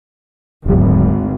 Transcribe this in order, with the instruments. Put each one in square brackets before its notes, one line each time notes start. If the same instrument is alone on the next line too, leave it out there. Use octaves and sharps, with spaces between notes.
[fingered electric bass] D#1 F#3 [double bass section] G#1 D2